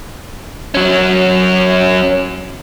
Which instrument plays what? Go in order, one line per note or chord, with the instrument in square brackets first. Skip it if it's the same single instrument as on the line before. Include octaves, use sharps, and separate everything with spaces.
[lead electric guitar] F#3 C#4